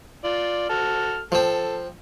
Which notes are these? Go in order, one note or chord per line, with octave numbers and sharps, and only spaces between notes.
F4 D5
F#4 A4 F6
F3 C4 A4